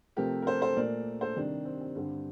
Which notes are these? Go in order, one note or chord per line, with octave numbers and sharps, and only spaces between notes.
C3 F3 A3 G4 A#4
A#4
A4 C5
A4 C5
A#2 A3 A#4 D5
A4 C5
C3 D#3 G3 D4
C4
C4
G2 D3 G3 C4